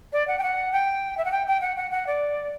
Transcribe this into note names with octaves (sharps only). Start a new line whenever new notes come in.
D5
F#5
G5
F#5
G5
E5
F#5
G5
G5
F#5
F#5
F#5
D5